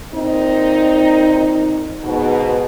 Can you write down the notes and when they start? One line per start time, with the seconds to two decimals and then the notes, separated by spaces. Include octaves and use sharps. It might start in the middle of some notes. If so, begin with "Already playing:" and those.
0.13 A#2 C4 D#4
2.02 G#2 B2